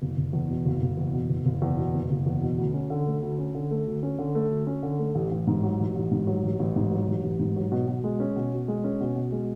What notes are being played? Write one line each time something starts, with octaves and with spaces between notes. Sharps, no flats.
F#1
F#1
E2
B2
F#1
F#1
E2
B2
F#1
F#1
E2
B2
F#1
F#1
E2
B2
D2
C#4
D3
A3
D2
C#4
D3
A3
D2
C#4
D3
A3
D2
C#4
D3
A3
A1
A1
G#2
F#3
A1
A1
G#2
F#3
A1
A1
G#2
F#3
A1
A1
G#2
F#3
B2
B2
G#3
C#4
B2
B2
G#3
C#4
B2
B2
G#3